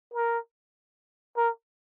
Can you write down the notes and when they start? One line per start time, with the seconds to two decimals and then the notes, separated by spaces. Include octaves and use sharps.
0.14 A#4
1.37 A#4